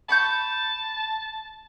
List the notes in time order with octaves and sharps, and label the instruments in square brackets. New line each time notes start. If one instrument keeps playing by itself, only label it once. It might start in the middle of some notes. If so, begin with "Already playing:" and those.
[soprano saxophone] A5 [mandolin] B5 C#6 G6